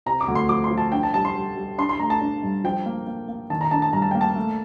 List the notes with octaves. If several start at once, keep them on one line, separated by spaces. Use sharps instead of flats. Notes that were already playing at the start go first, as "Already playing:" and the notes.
C3 A#5
D6
D2
C6
F3 D6
C6
F3
A5
D4 G5
A5
G3 A5
C6
G3
G3
D4 C6
C6
A3 A#5
A5
D4
G2
F3 G5
A#3
A#3
A#3
D#3 A5
A#5
D4 A5
A5
G2 A#5
A5
A#3 G5
A5
A3